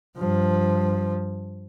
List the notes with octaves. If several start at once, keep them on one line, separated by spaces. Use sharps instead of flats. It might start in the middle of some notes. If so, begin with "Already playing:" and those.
G2 F3